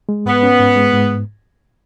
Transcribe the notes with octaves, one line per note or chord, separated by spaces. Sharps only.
G#3
G#2 B3
C#4
G#2
G#3
G#2